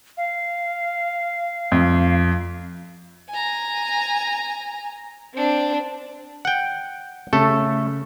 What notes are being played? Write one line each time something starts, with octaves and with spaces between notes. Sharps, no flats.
F5
F2
G#5 A#5
C4 D4
F#5 G5
C#3 A3 A4